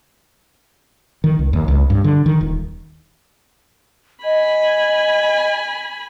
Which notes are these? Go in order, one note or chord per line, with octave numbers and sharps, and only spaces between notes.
D#3
C#2
D#2
C#2
G2
D3
D#3
D#1
D#5 G#5 B5